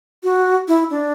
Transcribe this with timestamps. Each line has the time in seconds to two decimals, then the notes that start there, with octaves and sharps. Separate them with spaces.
0.24 F#4
0.68 E4
0.90 D4